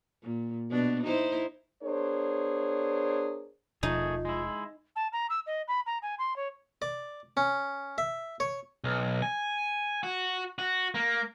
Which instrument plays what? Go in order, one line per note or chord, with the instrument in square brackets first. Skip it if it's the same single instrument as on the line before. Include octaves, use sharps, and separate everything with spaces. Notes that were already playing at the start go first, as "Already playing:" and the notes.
[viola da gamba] A#2
B2 B3 D4
D#4 E4 C5
[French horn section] B3 D4 G#4 A#4 C5 C#5
[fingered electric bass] D#1 B2 F3 [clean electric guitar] A3 G#4 [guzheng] D#4 [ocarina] F4
[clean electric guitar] G#3 E4
[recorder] A5
A#5
E6
D#5
B5
A#5
G#5
C6
C#5
[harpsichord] D5
C#4
E5
C#5
[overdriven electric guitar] B1
G#5
F#4
F#4
A#3